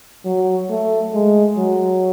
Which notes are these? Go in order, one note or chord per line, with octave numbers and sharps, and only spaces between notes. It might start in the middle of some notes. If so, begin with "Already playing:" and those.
F#3
A3
G#3
F#3